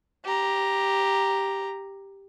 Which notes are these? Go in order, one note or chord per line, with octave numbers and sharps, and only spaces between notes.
G4 A#5